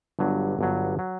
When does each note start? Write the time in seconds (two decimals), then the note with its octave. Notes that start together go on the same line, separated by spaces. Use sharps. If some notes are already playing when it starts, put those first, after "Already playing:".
0.19 G1 G2 F#3
0.59 G1 G2 F#3
0.99 F#3